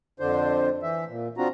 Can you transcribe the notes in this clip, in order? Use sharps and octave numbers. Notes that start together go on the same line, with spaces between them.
F2 D3 D4 C5
E3 E5
A#2
C4 D4 F4 F#4 A#5